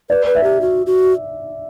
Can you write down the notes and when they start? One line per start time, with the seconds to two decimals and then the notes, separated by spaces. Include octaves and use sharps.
0.10 B4 D5
0.26 B4
0.35 E5
0.43 G4
0.61 F#4
0.86 F#4